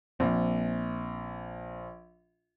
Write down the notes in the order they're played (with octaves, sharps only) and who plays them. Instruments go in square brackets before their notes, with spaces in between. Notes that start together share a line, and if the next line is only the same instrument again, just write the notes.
[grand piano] A#1 [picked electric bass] A#3 C4